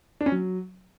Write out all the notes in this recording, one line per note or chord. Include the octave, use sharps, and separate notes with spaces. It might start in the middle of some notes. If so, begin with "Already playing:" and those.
D4
C#4
F#3